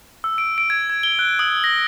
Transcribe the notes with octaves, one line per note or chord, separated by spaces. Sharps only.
E6
D7
D7
G#6
G#6
G7
F#6
D#6
A#6